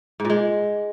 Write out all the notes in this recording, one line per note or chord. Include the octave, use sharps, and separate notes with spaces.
G#2
A#2
G#3